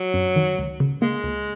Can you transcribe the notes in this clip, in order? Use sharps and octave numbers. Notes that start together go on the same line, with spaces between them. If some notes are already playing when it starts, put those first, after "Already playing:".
Already playing: F#3
F#2
D#3
C#2
C#3
G#3 A#3
C#2